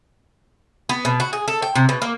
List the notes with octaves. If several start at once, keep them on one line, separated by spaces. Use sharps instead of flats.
B3
B2
F#4
G#4
A4
G5
C3
B2
A#3